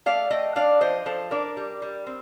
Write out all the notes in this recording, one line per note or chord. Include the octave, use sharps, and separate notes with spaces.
A3 D5 F5
A3 D#5 G5
D4 D5 F5
F3 C5 D#5
F3 A4 C5
D4 A#4 D5
G3
G3
C4